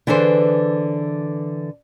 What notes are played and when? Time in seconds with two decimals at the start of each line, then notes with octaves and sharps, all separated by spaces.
0.07 D3 E3 G#4 A4 B4 C5